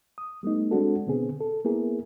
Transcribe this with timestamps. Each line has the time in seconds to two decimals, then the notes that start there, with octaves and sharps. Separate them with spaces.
0.18 D#6
0.43 G3 A3 B3 D#4
0.71 G#3 C4 D4 F#4 A4
1.07 B2 D3 B3 C4 G#4
1.41 A4
1.65 A#3 B3 E4 G#4 A#4